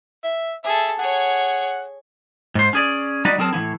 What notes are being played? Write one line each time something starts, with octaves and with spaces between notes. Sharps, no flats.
E5
G#4 A4 E5
G#4 C#5 F#5
G#2 C5
C#4 G#4 D5
G3 D#4 F#4 B4 D5 D#5
F#3 C4 G#4 A#4 A5
A2 E3 B3 E4